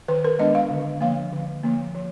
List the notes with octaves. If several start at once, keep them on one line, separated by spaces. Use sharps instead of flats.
D#3 B4
A#4
G#3 B3 D4 D#5
F5
D3
F3 A#3 F5
D3
F3 A#3
F3